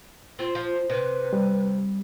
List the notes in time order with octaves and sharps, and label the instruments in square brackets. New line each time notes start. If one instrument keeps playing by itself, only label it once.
[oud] C4 [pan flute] F4
[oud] F3
[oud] C3 [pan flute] B4
[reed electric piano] G3